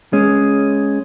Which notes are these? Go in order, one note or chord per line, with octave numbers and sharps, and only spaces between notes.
G#3 C#4